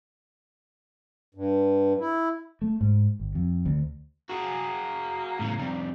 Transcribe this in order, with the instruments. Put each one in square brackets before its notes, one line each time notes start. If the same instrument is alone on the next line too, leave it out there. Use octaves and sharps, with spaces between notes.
[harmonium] G2
E4
[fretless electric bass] A3
G#2
G1
F2
D2
[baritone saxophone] A#3 [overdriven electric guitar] F#4 G#4
[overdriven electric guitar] A2 C#3
F2 G3